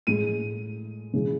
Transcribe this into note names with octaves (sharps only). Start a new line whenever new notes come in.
A2 G#3 D#7
C#3 E3 G#3